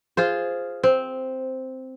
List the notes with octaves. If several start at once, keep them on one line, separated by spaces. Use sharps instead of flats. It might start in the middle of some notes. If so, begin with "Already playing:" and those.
F4 G#4 C5
C4